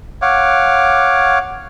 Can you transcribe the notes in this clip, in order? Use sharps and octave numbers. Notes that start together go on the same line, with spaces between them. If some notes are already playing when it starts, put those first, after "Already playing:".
C#5 F5 F#5 D6